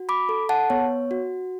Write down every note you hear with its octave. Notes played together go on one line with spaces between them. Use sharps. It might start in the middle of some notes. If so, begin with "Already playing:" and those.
Already playing: F#4
B5 D6
A4
F#5 A5
B3 C#5
F#4